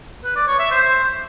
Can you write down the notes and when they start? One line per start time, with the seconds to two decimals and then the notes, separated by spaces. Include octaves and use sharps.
0.24 B4
0.36 D5
0.48 C#5
0.59 E5
0.71 C5